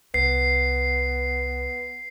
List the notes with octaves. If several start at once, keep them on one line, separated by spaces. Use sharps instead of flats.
C2 B3 C7